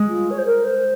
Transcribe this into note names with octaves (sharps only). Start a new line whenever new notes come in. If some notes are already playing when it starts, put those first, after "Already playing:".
Already playing: G#3
F4
C#5
C5
A#4
C5